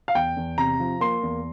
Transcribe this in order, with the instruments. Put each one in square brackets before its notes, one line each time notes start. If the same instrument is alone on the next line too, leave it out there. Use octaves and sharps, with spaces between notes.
[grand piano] F5
E2 G5
E2
C3 A#5
F3
A#3 C6
E2